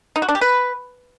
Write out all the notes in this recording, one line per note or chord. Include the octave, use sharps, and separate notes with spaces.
D#4
F#4
D4
G4
B4